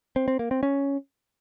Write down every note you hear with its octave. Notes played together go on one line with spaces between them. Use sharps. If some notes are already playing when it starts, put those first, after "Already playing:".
C4
C4
A#3
C4
C#4